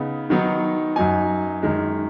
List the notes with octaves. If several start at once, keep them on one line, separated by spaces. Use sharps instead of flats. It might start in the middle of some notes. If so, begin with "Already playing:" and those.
Already playing: C#3 B3 D#4
D#3 F#3 B3 D#4
F#2 F#3 D#4 G#5
F#2 D#3 G#3